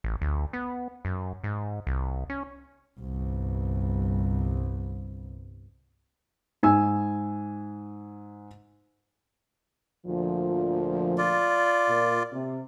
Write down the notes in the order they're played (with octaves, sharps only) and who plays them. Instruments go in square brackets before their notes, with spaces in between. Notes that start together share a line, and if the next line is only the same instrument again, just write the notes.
[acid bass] A1
D2
B3
F#2
G#2
C2
C#4
[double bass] G1 C2
[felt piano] G#2 G#5 E6
[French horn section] D2 A#2 F3
[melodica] F4 D5
[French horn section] A#2
C3